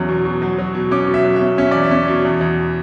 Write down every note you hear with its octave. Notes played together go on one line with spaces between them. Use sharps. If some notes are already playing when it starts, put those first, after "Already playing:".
Already playing: E2 F#3 C#4
B2
B2
F#3
F#3
B2
C#4 D6
B2
E5
F#3
E5
C#4
C#4 E5
E2 D5
E5
C#4
B2
E2
E2